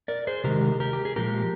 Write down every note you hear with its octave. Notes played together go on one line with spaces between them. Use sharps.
A#4 D5
G#4 C5
C3 D#3 G#3 G4 A#4
G4 A#4
G4
G#4
A#2 F3 G#3 G4 A#4